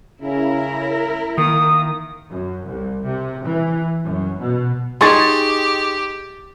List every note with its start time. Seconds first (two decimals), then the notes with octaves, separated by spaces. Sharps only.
0.22 C#3 E4 A#4
1.38 D#3 A#3 D#6
2.31 F#2
2.68 C2
3.05 C3
3.46 E3
4.04 F#2
4.40 B2
5.01 D#4 G4 G#4 C6 C#6 A6